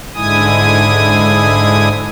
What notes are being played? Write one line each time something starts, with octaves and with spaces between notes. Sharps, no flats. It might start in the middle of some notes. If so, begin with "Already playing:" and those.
G#2 D3 G#3 E4 G#5 D#6